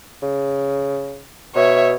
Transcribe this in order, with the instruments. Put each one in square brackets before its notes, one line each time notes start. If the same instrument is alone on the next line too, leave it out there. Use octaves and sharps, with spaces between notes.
[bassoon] C#3
[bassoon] B2 [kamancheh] C#5 E5